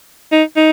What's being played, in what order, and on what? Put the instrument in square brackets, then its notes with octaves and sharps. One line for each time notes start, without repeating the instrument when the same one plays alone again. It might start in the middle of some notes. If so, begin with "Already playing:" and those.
[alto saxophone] D#4
D#4